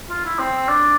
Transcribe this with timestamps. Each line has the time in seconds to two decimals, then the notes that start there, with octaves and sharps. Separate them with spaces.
0.10 F4
0.25 E4
0.39 C4
0.69 D4